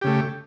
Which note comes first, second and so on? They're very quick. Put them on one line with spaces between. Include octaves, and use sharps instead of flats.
G4 C#3 A3